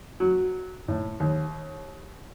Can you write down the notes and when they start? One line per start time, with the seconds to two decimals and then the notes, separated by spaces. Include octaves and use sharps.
0.20 F#3
0.88 A2
1.20 D#2